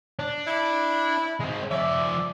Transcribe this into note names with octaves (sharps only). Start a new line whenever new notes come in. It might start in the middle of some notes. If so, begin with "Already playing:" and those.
D4
E4
G#3 C4
F3 D5 E5